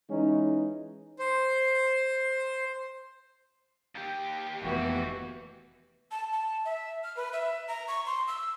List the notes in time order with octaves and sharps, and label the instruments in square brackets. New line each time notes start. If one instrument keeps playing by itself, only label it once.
[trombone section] E3 G#3 C#4 D#4
[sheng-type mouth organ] C5
[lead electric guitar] D#2 G4
[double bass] F1 B3 [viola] E3 F#4
[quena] A5
A5
E5
F6
B4
E5
A#5
C#6
C6
E6